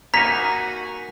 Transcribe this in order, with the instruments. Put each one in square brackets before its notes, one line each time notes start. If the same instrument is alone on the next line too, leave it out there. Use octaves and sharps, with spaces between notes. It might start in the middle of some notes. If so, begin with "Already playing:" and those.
[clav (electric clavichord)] A#3 D#4 [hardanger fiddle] F#4 G#5 [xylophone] A#5 [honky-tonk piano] B6